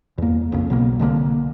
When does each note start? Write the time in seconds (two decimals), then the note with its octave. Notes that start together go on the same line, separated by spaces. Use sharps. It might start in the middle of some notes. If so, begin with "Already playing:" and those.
0.18 E2 A#3
0.52 A#1 F2 C#3
0.70 B1 B2 A#3
0.99 C2 D3 G3 A#3